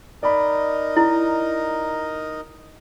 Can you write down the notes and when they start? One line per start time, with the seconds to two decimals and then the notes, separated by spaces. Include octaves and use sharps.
0.23 D#4 A#4 D5 D#5 B5
0.97 E4